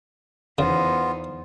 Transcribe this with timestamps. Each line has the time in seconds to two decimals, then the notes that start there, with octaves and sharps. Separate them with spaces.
0.58 E2 C#3 B3 D#4 F4 C5